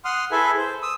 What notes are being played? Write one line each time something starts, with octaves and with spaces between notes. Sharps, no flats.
F#5 C6 D#6 F6
E4 G#4 A4 B4 E5 G#5
C5
D#6 E6